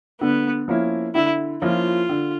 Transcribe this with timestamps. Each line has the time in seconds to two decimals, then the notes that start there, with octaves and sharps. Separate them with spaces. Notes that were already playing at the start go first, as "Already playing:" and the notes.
0.21 D3 B3
0.68 F3 A#3 C#4 E4
1.15 D3 E4
1.62 F3 A#3 C#4 E4 F4
2.09 D3